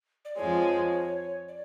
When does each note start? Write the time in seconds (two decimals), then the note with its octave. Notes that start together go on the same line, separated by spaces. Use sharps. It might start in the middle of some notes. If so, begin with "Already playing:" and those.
0.25 D5
0.37 F2 F3 G#3 C#5
1.48 D5